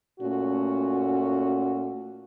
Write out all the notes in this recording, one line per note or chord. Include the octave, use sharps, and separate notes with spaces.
A#2 A3 C#4 F#4